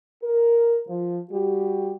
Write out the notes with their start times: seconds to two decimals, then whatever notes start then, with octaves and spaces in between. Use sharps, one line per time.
0.23 A#4
0.87 F3
1.31 G3 F#4 G4